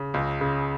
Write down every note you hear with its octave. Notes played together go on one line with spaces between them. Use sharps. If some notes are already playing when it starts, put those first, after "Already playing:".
Already playing: C#3
C#2
C#3